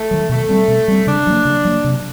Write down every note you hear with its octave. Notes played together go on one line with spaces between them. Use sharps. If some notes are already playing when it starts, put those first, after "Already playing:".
Already playing: A3
D#3 F#3
B2 A3
G3 C4
B2
G3 C4
C#3 D4
F#3 A#3
C#3
F#3 A#3
C3